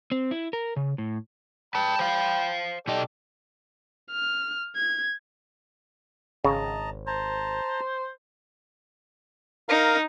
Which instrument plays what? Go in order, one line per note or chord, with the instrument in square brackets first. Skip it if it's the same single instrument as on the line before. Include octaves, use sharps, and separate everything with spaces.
[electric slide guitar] C4
E4
A#4
C#3
A2
[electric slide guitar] B4 A5 [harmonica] G5 B5
[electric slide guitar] C5 F5
[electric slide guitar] B2 D#4 D#5 [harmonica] G4 A4 D5
[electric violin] F6
G#6
[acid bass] G#1 [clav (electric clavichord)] C#3 [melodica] D#5 A5 A#5
[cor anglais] C5 [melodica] A5 A#5
[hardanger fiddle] D#4 [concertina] A#4 F5 A#5